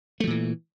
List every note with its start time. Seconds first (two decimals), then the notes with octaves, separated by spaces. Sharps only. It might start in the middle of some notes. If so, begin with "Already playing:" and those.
0.20 A3
0.24 F3
0.27 A#2
0.30 E3